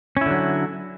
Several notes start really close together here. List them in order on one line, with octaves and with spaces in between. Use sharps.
C#4 E4 D3 F#3